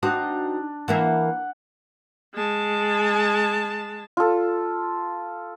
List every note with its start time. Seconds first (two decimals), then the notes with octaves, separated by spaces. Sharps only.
0.03 C4 D4 D#4 F#4
0.88 E3 A#3 E5 F#5
2.34 G#3 A5
4.17 F4 A4